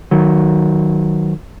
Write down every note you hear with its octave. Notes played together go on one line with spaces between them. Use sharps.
D#3 F#3